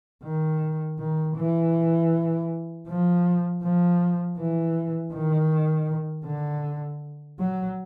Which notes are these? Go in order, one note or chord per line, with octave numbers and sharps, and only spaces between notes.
D#3
D#3
E3
F3
F3
E3
D#3
D3
F#3